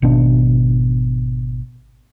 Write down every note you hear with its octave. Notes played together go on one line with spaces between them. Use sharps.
G#1 B2 D4